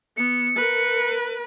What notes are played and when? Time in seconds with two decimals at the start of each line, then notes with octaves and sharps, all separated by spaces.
0.17 B3 C#7
0.56 A#4 B4